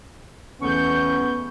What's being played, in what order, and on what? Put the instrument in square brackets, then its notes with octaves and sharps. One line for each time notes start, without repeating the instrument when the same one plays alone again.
[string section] E2 A3 G6 [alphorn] B3 [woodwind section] C#4 C#6